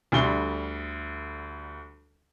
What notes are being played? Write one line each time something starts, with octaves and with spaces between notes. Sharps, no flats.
D2 D3 G3 C6 G7